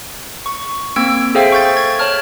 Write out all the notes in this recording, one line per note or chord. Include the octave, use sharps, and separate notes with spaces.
C#6
A#3 C4 E6 G#6 D7
G#4 A4 C5 E5 F5 G5
C#6 G6 A6
G#6
C#5 A5 F6